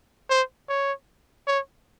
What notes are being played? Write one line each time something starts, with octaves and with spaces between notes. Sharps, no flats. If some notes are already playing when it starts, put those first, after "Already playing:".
C5
C#5
C#5